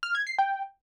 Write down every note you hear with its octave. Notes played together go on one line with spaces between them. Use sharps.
F6
G#6
C7
G5